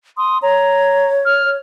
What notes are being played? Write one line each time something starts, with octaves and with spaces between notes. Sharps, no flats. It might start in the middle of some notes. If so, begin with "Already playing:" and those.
C6 D#6
C#5 A#5
F6